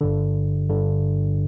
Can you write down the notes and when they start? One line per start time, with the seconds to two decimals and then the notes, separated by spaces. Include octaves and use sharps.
0.01 G1 G2 D3
0.69 G1 G2 D3